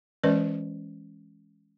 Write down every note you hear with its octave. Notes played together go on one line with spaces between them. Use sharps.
E3 G#3 C#4 B4 D5